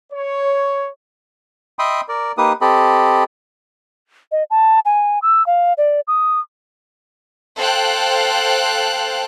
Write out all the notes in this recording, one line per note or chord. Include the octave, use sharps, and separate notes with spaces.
C#5
D#5 E5 G5 B5 C6 D#6
A#4 D5
A#3 D#4 G4 B4 D#6
C4 G4 A4 D#5 B5
D#5
A5
G#5
E6
F5
D5
D#6
A4 C5 F5 G5 F#6